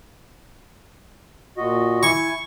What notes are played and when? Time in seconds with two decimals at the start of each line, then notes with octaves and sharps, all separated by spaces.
1.57 A#2 F#4 D#5
2.03 E4 G#5 C#6